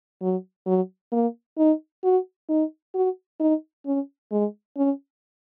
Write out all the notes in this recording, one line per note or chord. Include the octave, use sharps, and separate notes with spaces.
F#3
F#3
A#3
D#4
F#4
D#4
F#4
D#4
C#4
G#3
C#4